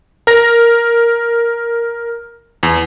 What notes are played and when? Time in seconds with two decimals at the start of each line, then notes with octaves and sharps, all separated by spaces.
0.27 A#4 A#6
2.63 E2